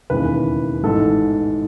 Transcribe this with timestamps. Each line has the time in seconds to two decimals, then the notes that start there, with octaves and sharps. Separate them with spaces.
0.10 E1 D#2 C#3 E3 B4
0.83 A1 G#2 E3 A4